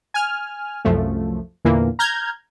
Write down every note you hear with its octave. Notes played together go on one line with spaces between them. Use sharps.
G#5 F6
C2 F#2 F3 A3
E2 A#2 D3 E3 A#3
A#5 F6 G6 G#6